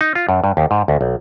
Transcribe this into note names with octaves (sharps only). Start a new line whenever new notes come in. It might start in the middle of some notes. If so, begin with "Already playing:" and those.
D#4
F4
F#2
G2
D#2
G#2
D2
B1